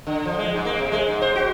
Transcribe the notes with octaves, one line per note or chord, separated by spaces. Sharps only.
D3
F3
G#3
G#2
A#3
C3
G#3
G#2
C5
F#4